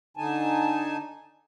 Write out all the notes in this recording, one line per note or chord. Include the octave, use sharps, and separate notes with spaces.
D3 D#4 G#5 A5